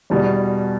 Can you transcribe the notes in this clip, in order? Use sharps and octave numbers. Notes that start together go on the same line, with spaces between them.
E2 B2 G3